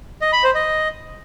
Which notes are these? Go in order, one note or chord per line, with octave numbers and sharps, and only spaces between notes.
D#5
B5
C5
D#5